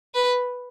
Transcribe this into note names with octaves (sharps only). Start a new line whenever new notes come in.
B4